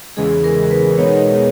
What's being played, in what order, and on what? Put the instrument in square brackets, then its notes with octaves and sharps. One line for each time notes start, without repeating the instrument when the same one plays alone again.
[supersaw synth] E2 C#3 E3 G#3 [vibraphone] G#4
[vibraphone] A#4
B4
[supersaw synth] E2 B2 G#3 B3 D#4 [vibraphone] C#5